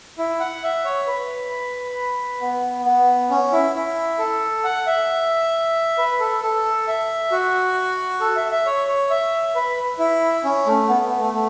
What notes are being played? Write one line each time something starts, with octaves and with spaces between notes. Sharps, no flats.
E4
F#5
E5
C#5
B4
B3
B3
C#4
E4
E4
A4
F#5
E5
B4
A4
A4
E5
F#4
A4
E5
E5
C#5
C#5
E5
B4
E4
C#4
A3
B3
B3
A3
A3